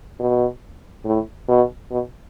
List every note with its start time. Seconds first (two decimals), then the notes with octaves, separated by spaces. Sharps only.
0.20 B2
1.05 A2
1.48 B2
1.91 B2